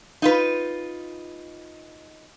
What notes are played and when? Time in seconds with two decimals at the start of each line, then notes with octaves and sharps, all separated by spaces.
0.22 D#4 F4 B4